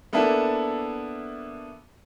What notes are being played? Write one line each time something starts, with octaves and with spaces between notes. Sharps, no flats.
A#3 B3 D4 E4 A4